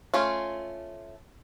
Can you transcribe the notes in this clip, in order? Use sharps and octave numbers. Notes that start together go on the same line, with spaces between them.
A3 C#4 F4